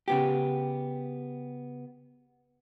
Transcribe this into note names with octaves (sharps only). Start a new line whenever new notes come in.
C#3 B3 G4